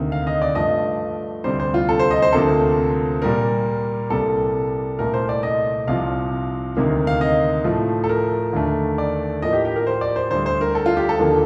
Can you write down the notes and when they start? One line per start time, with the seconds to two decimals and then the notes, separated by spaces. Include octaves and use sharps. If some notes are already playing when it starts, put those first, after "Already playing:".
Already playing: D2 C3 D#3 A#3
0.12 F5
0.27 D#5
0.42 D5
0.55 G2 F3 A3 D#5
1.44 D2 C3 G3 C5
1.60 C5
1.74 F4
1.89 A4
1.99 C5
2.11 D#5
2.22 C5
2.32 D2 C3 F3 A#3 A4
3.22 A#2 G3 A#3 A#4
4.10 C2 C3 G3 A#3 A4
4.99 C2 A#2 A3 A#4
5.14 C5
5.29 D5
5.43 D#5
5.87 C2 C3 F3 F5
6.77 D2 C3 D#3 A#3
7.07 F5
7.21 D#5
7.64 A2 F3 A3
8.04 A4
8.09 A#4
8.53 D#2 D3 A3
8.98 D5
9.42 A2 F3 A#3 D#5
9.53 G4
9.65 G4
9.76 A#4
9.87 C5
10.01 D5
10.16 C5
10.31 D2 D3 G3 C5
10.46 C5
10.61 A#4
10.75 A4
10.86 F4
10.97 G4
11.09 A4
11.20 D#2 D3 F3 A#3